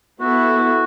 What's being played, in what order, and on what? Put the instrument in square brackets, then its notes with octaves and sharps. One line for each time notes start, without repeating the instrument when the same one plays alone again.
[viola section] B3 E4 A4 [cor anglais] F#4